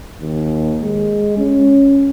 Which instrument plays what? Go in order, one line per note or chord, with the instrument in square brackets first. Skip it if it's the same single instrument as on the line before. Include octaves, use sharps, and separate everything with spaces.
[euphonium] D#2
G#3
C#4